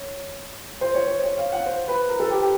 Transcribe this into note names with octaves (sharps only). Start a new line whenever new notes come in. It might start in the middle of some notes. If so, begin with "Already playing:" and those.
Already playing: C#5
C5
C#5
C5
C#5
F5
F#5
C5
B4
A#4
A4
G4
G4